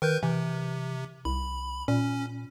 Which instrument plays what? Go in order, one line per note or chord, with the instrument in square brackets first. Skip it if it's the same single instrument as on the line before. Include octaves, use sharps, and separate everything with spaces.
[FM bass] D#3 [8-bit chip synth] A#4 B4 G6
[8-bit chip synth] C3 [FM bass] E3
[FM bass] C2 [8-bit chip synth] B5
[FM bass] A#2 [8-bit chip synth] C#4